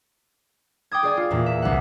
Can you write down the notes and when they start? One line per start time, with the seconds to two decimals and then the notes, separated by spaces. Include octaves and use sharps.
0.91 G5 D6 D#6 G#6
1.03 G#4 D5 G#5
1.17 F4
1.31 E2 A#2
1.46 E5
1.62 C2 F#5